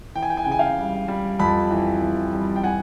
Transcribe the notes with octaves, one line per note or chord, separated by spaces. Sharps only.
E3 G5
G#5
G5
G#5
C#3 G5
G#5
F5 G5
G3
G3
F2 A5 B5
E3
E3
G3
G5
E3 F#5 G#5